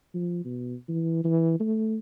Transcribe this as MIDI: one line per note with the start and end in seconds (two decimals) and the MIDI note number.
0.15 0.42 53
0.45 0.74 47
0.88 1.21 52
1.24 1.55 52
1.60 1.98 57